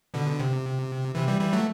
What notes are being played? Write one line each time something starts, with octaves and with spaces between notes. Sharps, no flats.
B2 D3
C3
C3 E3
E3 G3
E3 G3
F#3 A3